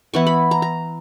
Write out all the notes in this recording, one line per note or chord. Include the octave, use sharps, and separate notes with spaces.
E3 B3 E4 C#6
B5
A#5
A#5